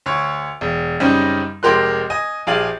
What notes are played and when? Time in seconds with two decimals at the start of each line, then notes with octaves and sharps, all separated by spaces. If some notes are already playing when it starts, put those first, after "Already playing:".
0.06 D2 C#5
0.61 E1
1.00 F#2 C#3 G3 C4 C#4 D#4
1.63 F1 G#3 G4 A#4 C6 F#6
2.10 D#5 G#5
2.47 A#1 G4 G#4 F5 A6 F#7